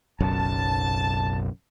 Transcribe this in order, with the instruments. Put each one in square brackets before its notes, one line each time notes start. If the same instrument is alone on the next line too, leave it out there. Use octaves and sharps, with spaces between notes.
[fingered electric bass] F#1 B1 F#2 [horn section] A5